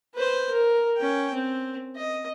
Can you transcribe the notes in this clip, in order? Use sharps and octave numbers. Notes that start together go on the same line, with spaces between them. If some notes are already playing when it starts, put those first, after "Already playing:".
B4 C5
A#4
C#4 G5
C4
D#5